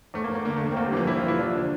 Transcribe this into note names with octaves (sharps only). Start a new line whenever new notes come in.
E2 A3
A#3
E2
A#3
D3 A#3
D3 A3
A#3
C4
E2 A#3
G3
E3 F3
E3 E4
F4
E3
E4
F3 D4
D3